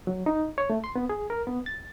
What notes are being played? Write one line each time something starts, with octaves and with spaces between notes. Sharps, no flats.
F#3
D#4
C#5
A3
C6
B3
G#4
A#4
B3
A6